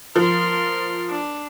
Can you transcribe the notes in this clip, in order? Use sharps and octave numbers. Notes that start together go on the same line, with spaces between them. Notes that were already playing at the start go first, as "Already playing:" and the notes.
F3 A#4 C6
D4